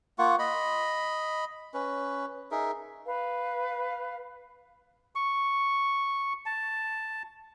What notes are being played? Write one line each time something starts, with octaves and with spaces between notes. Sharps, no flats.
A#3 F4 F#5 C#6
D#5 B5
C#4 B4
D#4 G#4 A#4 E5
B4 F5
C#6
A5